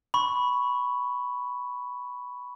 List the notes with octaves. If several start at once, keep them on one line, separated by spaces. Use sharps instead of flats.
B5 C#6